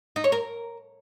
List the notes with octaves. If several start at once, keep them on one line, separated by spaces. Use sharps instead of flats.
D#4
C#5
A#4